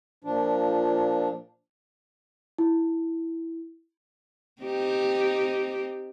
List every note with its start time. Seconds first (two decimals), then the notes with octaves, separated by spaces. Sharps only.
0.24 A#2 F3 D4
2.58 E4
4.62 C4 D#4 G4